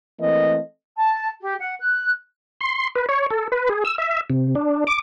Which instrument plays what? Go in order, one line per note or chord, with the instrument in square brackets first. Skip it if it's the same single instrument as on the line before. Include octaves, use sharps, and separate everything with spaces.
[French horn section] E3 A3 A#3 C4 D#5
[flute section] A5
G4
F#5
F#6
[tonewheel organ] C6
B4
C#5
A4
B4
G#4
E6
E5
C3
D4
D6